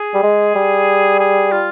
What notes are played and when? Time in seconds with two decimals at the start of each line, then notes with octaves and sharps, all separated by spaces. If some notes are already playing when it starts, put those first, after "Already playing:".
Already playing: G#4
0.14 G3
0.23 G#3
0.55 G3
1.20 G#4
1.52 F4